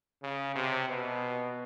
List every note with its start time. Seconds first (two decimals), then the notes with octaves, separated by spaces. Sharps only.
0.23 C#3
0.56 C3
0.88 B2